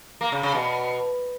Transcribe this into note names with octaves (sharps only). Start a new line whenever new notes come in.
A#3
C#3
C#3
B2